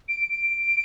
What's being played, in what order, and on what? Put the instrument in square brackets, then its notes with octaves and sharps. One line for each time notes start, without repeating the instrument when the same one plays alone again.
[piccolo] D7
D7